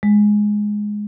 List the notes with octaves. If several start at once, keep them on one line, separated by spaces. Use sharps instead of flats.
G#3